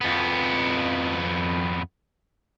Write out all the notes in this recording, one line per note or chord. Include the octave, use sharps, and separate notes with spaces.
F2 B3